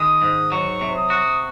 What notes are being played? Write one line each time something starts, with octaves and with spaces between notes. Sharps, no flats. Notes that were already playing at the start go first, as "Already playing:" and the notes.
Already playing: D#3 G#3 D#6
G#2
F#3 C#6
C3
D#6
F#4